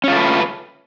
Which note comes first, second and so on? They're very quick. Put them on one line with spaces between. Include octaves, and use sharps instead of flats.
C#4 F4 A3 B4